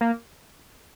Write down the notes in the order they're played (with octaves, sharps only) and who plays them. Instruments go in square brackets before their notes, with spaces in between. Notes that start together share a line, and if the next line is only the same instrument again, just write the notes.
[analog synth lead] A#3